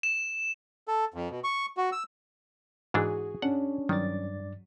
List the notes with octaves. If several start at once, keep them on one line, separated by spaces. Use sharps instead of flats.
E7
A4
F2
B2
C#6
F#4
E6
G#2 E3 D4 F#4 G#4
C#4 D4 F#5
G2 D#3 F#3 D5 A6